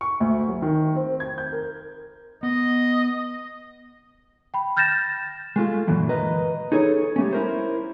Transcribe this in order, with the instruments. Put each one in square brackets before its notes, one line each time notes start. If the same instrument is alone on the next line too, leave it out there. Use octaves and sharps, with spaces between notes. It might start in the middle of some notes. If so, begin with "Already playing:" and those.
[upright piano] C#6
D2
F#3
D#3
C4
G#6
G6
A#4
[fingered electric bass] B3 [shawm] D#5
[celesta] G5 B5
F6 G6 A6 A#6 E7
[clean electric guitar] G#3 A3 F4
F#2 A#2 D3 E3 F#3
A#4 B4 D#5 A#5
D#4 G#4 A4 C#5
G3 A3 C#4
E4 A#4 C5